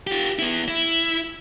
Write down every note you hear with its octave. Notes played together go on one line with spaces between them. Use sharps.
F4 G4
B3 E4
E4